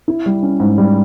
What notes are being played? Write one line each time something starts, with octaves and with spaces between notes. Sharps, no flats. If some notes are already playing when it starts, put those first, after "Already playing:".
E4
G3
C#4
G#2
G3